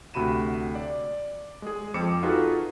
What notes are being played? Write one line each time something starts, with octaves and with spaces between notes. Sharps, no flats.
D2 C3 F#4 B5 D#7 E7
D5
G#3 G#4
F2 C4 D6 C#7 E7
D#4 F4 F#4 G#4 A4 B4